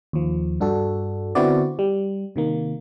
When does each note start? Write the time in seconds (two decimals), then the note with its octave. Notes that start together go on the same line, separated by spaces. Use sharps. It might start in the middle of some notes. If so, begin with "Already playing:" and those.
0.13 D#2 F3
0.60 G2 D4 F#4 A4
1.35 D3 B3 C4 E4 F#4 D5
1.79 G3
2.36 C3 D#3 A#3